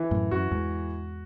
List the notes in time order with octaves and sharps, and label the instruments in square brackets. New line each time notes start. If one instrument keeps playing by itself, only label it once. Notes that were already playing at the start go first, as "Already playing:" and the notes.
Already playing: [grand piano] E3
[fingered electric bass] F#2 A2
[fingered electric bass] F#2 [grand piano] F#4
[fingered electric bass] E2 G#2